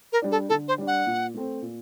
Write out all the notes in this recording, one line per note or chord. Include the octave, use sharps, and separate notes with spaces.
A#4
G3 D4
A4
D3 A4
C5
G3 D4
F#5
A#2
A3 C4
A#2